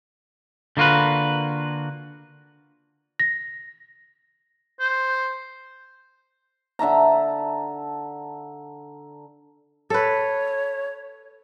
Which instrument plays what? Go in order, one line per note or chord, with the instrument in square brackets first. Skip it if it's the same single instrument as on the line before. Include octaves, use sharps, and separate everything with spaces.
[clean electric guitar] D3 A#3 F4 F#4 B4
[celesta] A#6
[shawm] C5
[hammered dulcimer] D3 E5 A5 A#5
[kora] A4 B4 [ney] C#5